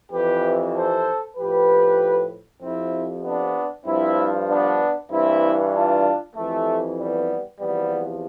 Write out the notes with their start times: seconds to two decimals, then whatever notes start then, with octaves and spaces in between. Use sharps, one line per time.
0.12 F2 C3 E3 G4 B4
0.75 A4 C5
1.37 A2 F3 G4 B4
2.62 F2 C3 F3 C4 E4
3.24 B3 D4
3.86 G2 F3 C4 E4
4.49 B3 D4
5.11 G2 E3 C4 E4
5.73 D4 F4
6.35 F2 C3 E3 A3
6.98 G3 B3
7.60 E2 C3 F3 G3 B3